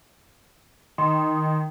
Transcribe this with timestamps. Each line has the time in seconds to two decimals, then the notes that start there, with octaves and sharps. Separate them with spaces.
0.98 D#3 C6